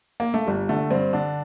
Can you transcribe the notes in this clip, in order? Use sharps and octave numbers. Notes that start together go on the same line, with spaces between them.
A#3
A3
G1 G3
D3 A3
G2 C4
D3 D4